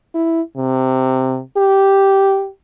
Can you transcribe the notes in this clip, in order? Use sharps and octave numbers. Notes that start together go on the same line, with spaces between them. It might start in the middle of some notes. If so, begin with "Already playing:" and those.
E4
C3
G4